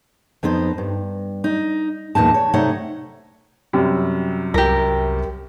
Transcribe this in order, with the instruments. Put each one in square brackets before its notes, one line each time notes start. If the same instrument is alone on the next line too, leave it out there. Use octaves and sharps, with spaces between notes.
[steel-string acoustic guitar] F2 B3 D#4 C5
G2
D#4
E2 A#2 D#4 A5
C#5
C3 A3 D#4 C#5 F#5
[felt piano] F#2 C3 G3
[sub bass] C2 [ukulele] G4 A#4